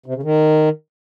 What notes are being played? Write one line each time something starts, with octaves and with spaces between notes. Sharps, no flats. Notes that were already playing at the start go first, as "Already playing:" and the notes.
C3
C#3
D#3